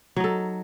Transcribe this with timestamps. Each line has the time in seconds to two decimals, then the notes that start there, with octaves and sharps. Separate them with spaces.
0.16 F#3
0.20 D#4
0.24 A4